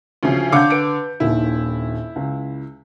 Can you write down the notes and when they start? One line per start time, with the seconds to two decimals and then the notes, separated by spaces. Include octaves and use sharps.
0.23 D2 C#3 F3 F#3
0.52 D3 F5 F#5 D6 G6 C#7
0.70 B4 D7
1.20 D#1 A#1 D#2 E4
2.16 C#2